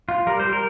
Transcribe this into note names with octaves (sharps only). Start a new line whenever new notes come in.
F4
G3 A#4
C5
G3
A#4